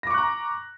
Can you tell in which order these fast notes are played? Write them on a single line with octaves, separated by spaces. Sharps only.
A#6 D6 C#6 F#6 A#5